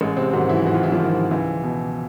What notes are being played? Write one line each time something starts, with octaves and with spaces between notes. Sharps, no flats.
A1 G#3
C3 C4
G#2 D#3 F#3 F#4
E3 E4
A1 F#4
F4
E4
F3 F4
G#2 D#3
C#2 E3 E4
B2